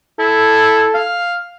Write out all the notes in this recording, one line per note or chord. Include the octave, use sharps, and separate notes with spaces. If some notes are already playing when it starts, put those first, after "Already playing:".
E4 A4
F5